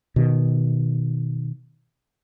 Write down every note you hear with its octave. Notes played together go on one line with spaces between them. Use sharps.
B2 D#3